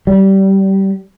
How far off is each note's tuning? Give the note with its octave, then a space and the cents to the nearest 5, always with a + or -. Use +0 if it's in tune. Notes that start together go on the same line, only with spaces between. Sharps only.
G3 -20